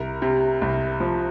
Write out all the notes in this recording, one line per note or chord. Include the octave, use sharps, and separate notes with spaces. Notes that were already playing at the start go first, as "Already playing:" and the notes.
Already playing: C2 A#4
C3
C2
F3